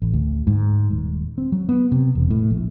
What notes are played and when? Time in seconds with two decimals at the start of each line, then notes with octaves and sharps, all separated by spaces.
0.02 A1
0.14 D2
0.47 G#2
0.91 D#1
1.38 C4
1.52 F#3
1.69 B3
1.92 C3
2.15 E1
2.30 A2
2.50 A#1